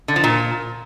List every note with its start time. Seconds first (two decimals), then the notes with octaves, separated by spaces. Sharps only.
0.08 D3
0.16 F3
0.24 A#2